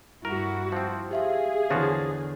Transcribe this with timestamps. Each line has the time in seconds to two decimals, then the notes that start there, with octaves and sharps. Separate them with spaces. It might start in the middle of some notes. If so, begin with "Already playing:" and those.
0.25 G2 E4 F#4 A#4
0.72 F3 C4
1.11 G4 G#4 E5 F5
1.70 E2 D3 F3 F4 F#4 C#5 D#6 A6